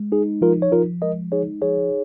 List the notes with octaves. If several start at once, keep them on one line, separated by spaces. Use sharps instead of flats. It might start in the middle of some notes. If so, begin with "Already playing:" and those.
Already playing: G#3
D#4 G#4
F3 F4 A#4
C#5
F3 F4 A#4
G#3 A#4 D#5
D#4 G#4 C#5
F3 G#4 C#5